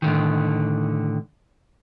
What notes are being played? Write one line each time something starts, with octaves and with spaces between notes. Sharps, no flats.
A2 D3 D#3